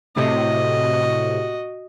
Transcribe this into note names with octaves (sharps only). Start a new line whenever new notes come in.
A2 C3 F#4 D#5